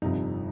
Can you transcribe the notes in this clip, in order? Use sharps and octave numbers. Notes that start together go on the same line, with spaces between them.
G1 F2 C3 F3 D#4